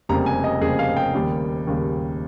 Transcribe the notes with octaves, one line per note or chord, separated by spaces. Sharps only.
F1 F2 C#3 G3 A#3 A#5
G#5
D#5
F1 F2 C#3 G3 A#3 G#4
F5
G5
D#2 C#3 G3 A#3
D#2 C#3 G3 A#3